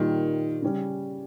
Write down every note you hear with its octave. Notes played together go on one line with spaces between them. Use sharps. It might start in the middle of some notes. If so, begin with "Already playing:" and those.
Already playing: A#2 D#3 G3 A#3 F4
C#3 G3 C#4